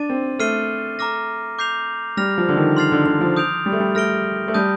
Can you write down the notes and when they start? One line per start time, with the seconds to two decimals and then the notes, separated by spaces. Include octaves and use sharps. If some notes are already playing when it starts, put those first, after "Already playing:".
Already playing: D4 D6 A6 D#7
0.10 C4
0.39 A3 F6 C7 D#7 G7
0.99 A#5 D6 F6 A#6
1.59 D6 G6 C7 F7
2.17 G3 F6 A#6 F7
2.38 F3
2.49 D3
2.57 D#3
2.77 C6 F6 A6 C7 F7
2.92 D3
3.06 D3
3.21 F3
3.37 D#6 G6 D7 F7
3.66 G3
3.72 A3
3.80 G3
3.95 A3 F6 A#6 D7 G7
4.48 A3
4.54 G3 A5 D#6 G6